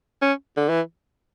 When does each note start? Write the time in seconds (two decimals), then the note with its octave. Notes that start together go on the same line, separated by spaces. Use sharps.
0.22 C#4
0.57 D3
0.69 E3